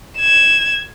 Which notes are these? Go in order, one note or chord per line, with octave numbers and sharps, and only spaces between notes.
G#6 E7